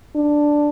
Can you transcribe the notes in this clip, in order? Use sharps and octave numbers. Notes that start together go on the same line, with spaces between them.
D4